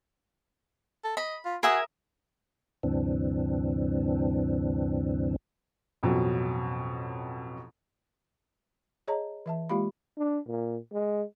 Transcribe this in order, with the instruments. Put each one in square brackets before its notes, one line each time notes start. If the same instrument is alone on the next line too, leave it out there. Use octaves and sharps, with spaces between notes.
[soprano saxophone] A4
[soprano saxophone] D#5 [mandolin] B5
[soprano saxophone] F4
[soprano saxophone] F#4 [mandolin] G#4 [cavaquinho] A#4 E5 D#6
[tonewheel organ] D2 G2 C3 E3 C4 D4
[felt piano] A1 F2 B2 F#3
[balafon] G#4 C#5 D#5 A5 A#5
E3 E5 A5
G#3 A#3 F4 G4 F5 B5
[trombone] D4
A#2
G#3